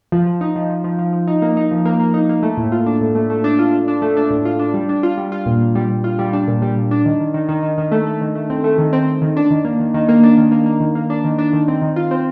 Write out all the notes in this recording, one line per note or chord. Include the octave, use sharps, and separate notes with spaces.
F3
F3
D#4
F3
F3
F3
F3
F3
D#4
A#3
D#4
F3
A#3
A#3
D#4
A#3
A3
A2
F4
D4
A2
A3
A3
D4
F4
D4
D4
A3
D4
A2
F4
D4
G3
D4
F4
G3
F4
A#2
A#2
G3
A#2
F4
G3
D4
A#2
G3
A#2
D4
D#3
D#3
D#3
D#3
D#3
D#3
A3
A3
D#3
A3
C4
A3
D#3
C4
C4
D#3
D4
D#3
A#3
D#3
D#3
A#3
D4
D#3
A#3
A#3
D#3
A#3
D4
D#3
D4
D#3
C4
D#3
F4
C4